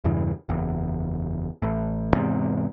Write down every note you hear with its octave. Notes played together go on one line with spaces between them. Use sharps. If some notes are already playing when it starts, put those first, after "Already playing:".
E2 G2 C#3 E3
F#1 E2
A1 A2
E2 G#2 C3